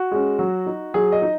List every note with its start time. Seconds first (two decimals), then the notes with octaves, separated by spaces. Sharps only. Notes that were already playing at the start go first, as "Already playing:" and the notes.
Already playing: F#4
0.11 G#3 C#4
0.39 F#3
0.66 D#4
0.94 F#3 G#4
1.12 D#5
1.22 D#4